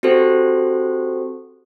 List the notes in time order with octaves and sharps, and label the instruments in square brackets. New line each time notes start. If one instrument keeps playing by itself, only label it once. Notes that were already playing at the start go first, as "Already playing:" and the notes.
[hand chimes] C4 F#4 G4 A4 C5